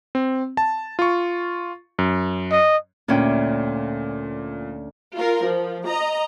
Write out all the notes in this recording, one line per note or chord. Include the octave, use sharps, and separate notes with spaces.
C4
A5
F4 C#6
F#2
D#5
D2 A#2 C#4 G5
F4 A#4
F3
D#5 A#5